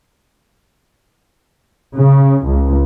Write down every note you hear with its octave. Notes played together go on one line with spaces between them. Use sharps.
C#3
C#2